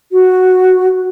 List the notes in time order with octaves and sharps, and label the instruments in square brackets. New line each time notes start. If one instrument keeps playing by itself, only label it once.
[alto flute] F#4